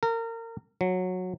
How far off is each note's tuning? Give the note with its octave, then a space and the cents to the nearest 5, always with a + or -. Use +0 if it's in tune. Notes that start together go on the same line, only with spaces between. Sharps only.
A#4 -30
F#3 -15